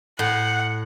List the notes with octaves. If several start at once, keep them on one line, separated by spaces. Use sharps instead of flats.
A2 F#5